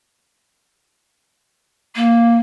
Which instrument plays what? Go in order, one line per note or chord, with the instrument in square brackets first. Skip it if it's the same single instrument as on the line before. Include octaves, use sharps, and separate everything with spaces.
[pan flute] A#3